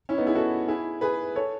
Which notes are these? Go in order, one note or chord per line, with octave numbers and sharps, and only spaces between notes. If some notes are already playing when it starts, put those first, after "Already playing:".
C#4 E4
B3 D#4
E4 G#4
F#4 A4
E4 G#4
G#4 B4
A4 C#5